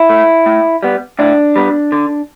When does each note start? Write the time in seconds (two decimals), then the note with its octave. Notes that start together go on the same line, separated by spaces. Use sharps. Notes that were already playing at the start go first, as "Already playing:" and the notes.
Already playing: E4
0.10 A3
0.46 A2
0.83 G3 B3
1.19 A2 D4
1.56 G3 B3
1.92 D3